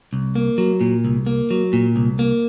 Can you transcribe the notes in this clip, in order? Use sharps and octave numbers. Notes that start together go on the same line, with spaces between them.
C2
A#3
F#3
A#2
C2
A#3
F#3
A#2
C2
A#3